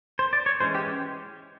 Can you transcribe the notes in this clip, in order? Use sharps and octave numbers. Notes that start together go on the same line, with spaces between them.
C5
D5
C#5
E3 G#3 C#4 C5
G4